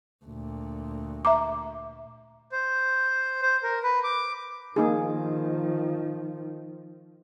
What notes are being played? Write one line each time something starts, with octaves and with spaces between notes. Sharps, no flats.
D2 A#2
E5 A#5 D6
C5
C5
A#4
B4
D6
D#3 F3 A#3 D#4 G#4